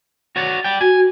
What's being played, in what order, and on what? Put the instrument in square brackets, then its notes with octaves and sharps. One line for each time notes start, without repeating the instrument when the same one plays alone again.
[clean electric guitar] F#4 C#5 D5
D5 G5
[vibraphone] F#4 [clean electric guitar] G#5